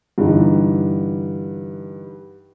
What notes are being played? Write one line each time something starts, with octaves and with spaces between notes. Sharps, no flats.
G2 D3 E3 D#4